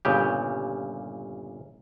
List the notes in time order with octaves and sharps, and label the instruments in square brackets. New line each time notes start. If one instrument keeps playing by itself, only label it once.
[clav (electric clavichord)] G1 A#2 C#3 G4